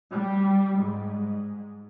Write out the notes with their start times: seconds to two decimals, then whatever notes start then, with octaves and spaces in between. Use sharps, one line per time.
0.12 G3
0.81 G#2